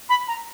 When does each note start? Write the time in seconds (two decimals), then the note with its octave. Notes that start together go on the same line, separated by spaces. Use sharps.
0.09 B5
0.28 A#5